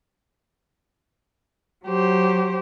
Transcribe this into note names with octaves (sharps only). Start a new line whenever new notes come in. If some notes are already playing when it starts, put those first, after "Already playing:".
F#3 G4 C5